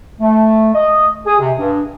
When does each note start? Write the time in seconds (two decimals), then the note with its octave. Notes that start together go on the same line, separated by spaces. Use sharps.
0.21 A3
0.75 D#5
1.26 G#4
1.39 C3
1.58 G2